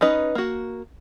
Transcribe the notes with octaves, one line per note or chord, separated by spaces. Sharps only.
C#4 D#4 B4 D#5
A#3 F#4